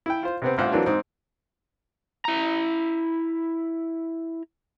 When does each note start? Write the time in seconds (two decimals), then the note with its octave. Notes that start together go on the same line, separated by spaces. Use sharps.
0.06 E4 G5
0.23 F4 C5
0.42 C3 B3 C4
0.58 A1 G2 F4 C5 F#5 F#6
0.72 E3 F#3 A#3 C4 D4 F4
0.86 G#2 C4 D#4
2.25 E4 A#5